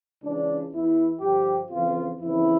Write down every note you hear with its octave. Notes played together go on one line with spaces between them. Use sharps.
C#2 C#3 E3 D4
E2 E3 E4
G2 D3 F3 G4
F2 C#3 E3 F4
F2 C#3 E3 E4